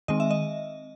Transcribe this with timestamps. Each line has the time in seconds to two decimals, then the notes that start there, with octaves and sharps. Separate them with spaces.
0.08 D#3 G#3 C4 D#5
0.20 E5
0.31 D#5